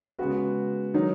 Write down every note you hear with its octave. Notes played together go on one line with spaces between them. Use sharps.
C#3 G#3 B3 F#4 B4
D#3 F#3 D#4